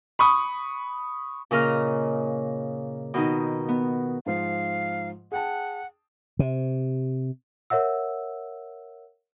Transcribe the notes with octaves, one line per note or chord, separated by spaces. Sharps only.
B5 C#6 D#6
A#2 C#3 A#4 D#5 F6
B2 D#3 D#4
B3
G#2 F3 F5
G#4 F#5 G5 A5
C3
A#4 C#5 E5 F#5 E6